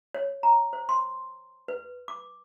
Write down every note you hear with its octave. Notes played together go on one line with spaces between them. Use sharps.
C#5
A#5
C5
C6
B4
D6